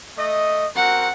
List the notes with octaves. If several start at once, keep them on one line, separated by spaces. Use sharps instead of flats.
A3 D#5
C4 F#4 A#4 F#5